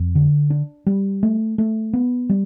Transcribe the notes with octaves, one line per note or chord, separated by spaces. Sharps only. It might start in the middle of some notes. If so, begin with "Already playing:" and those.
Already playing: F2
D3
D4
G3
A3
A3
B3
G3